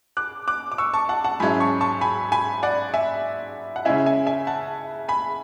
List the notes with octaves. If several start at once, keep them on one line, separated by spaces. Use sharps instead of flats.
D6 F#6
D6 F#6
D6
C#6 E6
A5 C#6
F#5 A5
F#5 A5
G#2 F#3 C#4 E4 G#5 B5
A5 C#6
A5 C#6
G#5 B5
G#5 B5
D5 F#5
E5 G#5
F#5
C#3 G#3 C#4 E4 E5 G#5
E5 G#5
E5 G#5
F#5 A5
G#5 B5